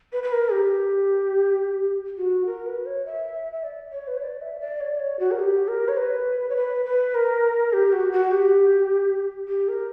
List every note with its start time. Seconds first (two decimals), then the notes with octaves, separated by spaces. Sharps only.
0.13 B4
0.23 B4
0.32 A#4
0.52 G4
2.18 F#4
2.46 A#4
2.66 B4
2.86 C#5
3.06 E5
3.52 E5
3.63 D5
3.92 C#5
4.07 B4
4.17 C#5
4.21 D5
4.41 E5
4.60 D5
4.80 C#5
4.92 D5
4.99 C#5
5.19 F#4
5.31 A#4
5.39 G4
5.68 A#4
5.88 C#5
5.97 B4
6.49 C#5
6.56 B4
6.85 B4
7.14 A#4
7.73 G4
7.93 F#4
8.12 F#4
8.31 G4
9.48 G4
9.68 A#4